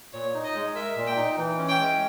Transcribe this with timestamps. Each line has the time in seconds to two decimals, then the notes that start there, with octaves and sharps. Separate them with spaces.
0.13 A#2 C#5
0.34 D#4
0.44 D#5
0.55 G#3
0.75 A#4 E5
0.96 A#2
1.07 G5
1.17 D#4
1.37 E3
1.58 C#4
1.69 G5
1.79 G#3